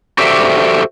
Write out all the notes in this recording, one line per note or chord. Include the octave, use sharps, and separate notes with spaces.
F#4 G4 A4 C5 D5 E5